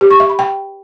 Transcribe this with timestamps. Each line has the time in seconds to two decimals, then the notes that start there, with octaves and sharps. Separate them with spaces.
0.01 G4
0.10 C#6
0.20 E5
0.29 B5
0.39 G5